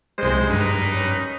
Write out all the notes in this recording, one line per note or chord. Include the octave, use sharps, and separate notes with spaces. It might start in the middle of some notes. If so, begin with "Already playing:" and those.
C2 G#3 C5
G2 D#4 A#4 B4
C#4